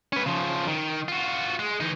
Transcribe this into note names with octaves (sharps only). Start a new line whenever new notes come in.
C#4 B4
C#3 F3
D#3
F4 F#4
G#3
E3 D#4